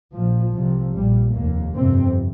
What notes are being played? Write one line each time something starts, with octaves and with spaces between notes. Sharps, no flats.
A#1 A#2 F3
C2 C3 F3
A#1 A#2 G3
F1 D#2 A#3
G1 F2 C3 C4